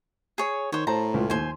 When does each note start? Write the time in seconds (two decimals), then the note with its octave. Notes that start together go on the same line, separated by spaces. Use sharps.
0.38 G#4 C#5
0.72 D#3 C5 C#5
0.87 A2 C5 A5 A#5
1.14 C#2 F4
1.30 D#2 C5 G#5